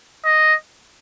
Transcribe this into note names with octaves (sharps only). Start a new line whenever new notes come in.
D#5